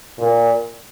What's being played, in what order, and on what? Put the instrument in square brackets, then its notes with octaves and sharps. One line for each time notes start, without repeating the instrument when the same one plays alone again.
[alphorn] A#2